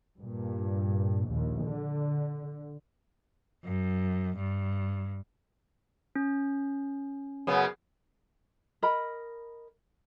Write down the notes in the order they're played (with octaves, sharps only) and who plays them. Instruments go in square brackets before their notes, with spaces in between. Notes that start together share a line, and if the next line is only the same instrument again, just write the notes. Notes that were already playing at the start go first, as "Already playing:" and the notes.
[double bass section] G2 A#2
A#1 D#2
D3
[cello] F#2
G2
[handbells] C#4
[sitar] F#2 C#3 B3
[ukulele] A#4 D#5 B5